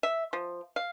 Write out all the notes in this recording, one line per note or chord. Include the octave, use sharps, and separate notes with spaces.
E5
F3
F5